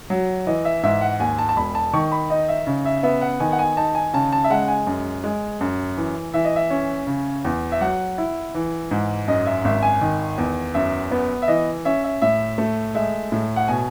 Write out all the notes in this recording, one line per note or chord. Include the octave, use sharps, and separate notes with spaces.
F#3
E3 D#5
E5
G#2 E5
F#5
D#2 G#5
A5
A5
E1 B5
A5
D#3 C#6
B5
D#4 D#5
E5
C#3
E5
B3 E5
F#5
D#3 G#5
F#5
G#5
D#4 A5
G#5
C#3 A5
A5
E5
G#3 F#5
G#5
F#2
G#3
F#2
E3
E3 E5
D#5
E5
C#4
C#3
E2
E5
F#3 F#5
E4
E3
G#2
F#2 D#5
E5
G#1 E5
G#5
D#3
E2
F#2 E5
B3
E5
E3 D#5
C#4 E5
E5
A2 E5
A3
G#3 E5
A2
F#5
B2 G#5